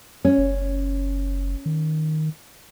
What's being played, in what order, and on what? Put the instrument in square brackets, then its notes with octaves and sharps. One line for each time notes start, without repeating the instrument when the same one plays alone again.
[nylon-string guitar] C#4
[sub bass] F#1
D#3